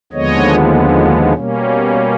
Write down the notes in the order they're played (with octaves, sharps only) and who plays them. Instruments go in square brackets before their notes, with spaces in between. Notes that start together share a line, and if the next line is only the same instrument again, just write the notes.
[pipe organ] D#2 D3 F3 G#3 B3 C#5 D#5
B2 G3 A#3 C#4